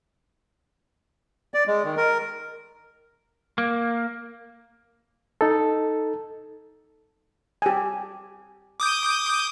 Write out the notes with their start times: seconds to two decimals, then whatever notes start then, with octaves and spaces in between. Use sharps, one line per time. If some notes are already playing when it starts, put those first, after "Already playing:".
1.54 D5
1.67 G#3
1.85 D#3
1.97 A#4
3.58 A#3
5.41 D#4 A4
7.62 G4 G#5
8.80 D6 D#6 G6